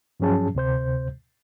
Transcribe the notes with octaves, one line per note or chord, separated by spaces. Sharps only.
G2 F3 F#3 C#4 G#4 A5
D2 C3 C5 G6